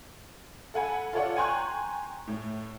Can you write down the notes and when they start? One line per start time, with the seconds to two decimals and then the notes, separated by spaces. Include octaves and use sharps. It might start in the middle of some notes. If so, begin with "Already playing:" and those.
0.74 A4 F#5 G#5 B5
1.13 F4 A4 C#5 D5 F#5
1.36 G5 G#5 A#5 C6 C#6 F#6
2.27 A2